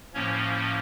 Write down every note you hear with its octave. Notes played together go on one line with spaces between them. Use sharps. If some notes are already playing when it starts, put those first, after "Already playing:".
A2 F3 A#3 C#4 C#5